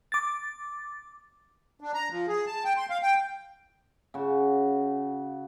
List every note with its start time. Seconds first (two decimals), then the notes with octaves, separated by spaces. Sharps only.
0.12 D6 A6
1.81 D4
1.94 A#5
2.11 F3
2.28 G#4
2.47 A5
2.65 G5
2.77 C6
2.90 F5
3.03 G5
4.14 C#3 F#4